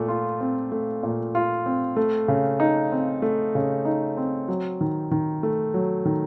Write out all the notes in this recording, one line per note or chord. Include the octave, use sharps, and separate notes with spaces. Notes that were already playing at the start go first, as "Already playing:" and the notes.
Already playing: A#2 A3
F4
C4
A3
A#2
F4
C4
A3
C#3
D#4
C4
A3
C#3
D#4
C4
F#3
D#3
D#3
A3
F#3
D#3